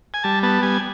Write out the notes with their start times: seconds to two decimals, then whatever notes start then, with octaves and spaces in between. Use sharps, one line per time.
0.14 G#5
0.24 G3 A5
0.43 B3 A5
0.63 G3 G#5